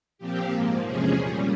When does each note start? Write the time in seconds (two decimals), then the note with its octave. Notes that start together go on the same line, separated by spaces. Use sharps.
0.18 A#2 F3 C4 G4
0.50 G#2 F3 A#3
0.82 E2 C3 F3 G#3 C#4 G#4
1.14 A#2 G3 C#4 G#4